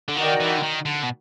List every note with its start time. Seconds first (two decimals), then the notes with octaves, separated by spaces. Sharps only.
0.09 D3
0.17 D#3 D#4 F#4 A#4 D5 G5
0.40 E3
0.58 D3
0.63 D#3
0.86 D3
1.03 B2